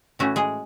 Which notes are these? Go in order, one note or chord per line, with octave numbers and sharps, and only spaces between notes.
A2 E3 A3 C#4 E4 F#4
G#3 G#4